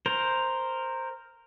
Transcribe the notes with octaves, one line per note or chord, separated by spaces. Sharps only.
A#4 C5